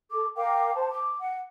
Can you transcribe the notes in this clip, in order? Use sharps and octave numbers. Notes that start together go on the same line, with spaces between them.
A4 D6
A#4 F5 G5 D6
C5 A5
D6
F#5